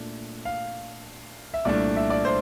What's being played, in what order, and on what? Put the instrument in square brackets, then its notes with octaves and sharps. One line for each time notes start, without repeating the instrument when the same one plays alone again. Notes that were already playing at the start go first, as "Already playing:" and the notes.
Already playing: [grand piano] A#2 A3 D4
F5
E5
C2 A#2 A3 D4 D5
E5
D5
C5